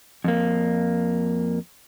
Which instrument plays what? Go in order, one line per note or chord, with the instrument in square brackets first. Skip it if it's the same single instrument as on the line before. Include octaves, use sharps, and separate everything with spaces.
[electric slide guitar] F2 A#3